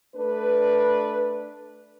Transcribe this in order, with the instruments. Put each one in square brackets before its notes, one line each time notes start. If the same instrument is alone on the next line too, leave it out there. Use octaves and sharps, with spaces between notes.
[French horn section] A3 D4 B4